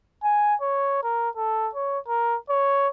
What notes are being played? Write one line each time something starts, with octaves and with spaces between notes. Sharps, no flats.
G#5
C#5
A#4
A4
C#5
A#4
C#5